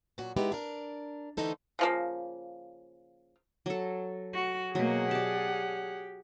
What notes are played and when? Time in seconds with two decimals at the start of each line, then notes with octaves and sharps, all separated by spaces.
0.18 A#2 F#3 F#4
0.37 G#3 B3 D#4 E4 G4
0.52 D4 A#4
1.37 D3 E3 A3 D#4 A4 C5
1.79 C#3 F3 A#3
3.66 F#3 A4
4.34 F#4
4.75 B2 F#3 A#3 G#4 F#5
5.11 G4 D5 A5